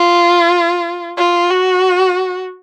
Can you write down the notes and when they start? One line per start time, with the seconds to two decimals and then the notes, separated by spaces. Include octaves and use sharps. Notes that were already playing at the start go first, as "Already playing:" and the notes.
Already playing: F4
1.17 F4
1.50 F#4